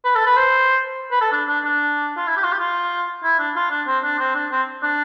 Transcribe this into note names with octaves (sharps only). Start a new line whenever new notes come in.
B4
A4
B4
C5
B4
A4
D4
D4
D4
F4
E4
G4
F4
G4
F4
E4
D4
F4
D4
C4
D4
C4
D4
C4
D4